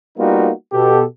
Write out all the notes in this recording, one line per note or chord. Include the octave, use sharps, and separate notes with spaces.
G3 A#3 B3 D#4 F4 F#4
B2 G4 A4